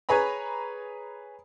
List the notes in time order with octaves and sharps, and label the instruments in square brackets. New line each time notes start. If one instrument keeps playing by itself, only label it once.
[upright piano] G#4 B4 C#5 G#5 A#5 B5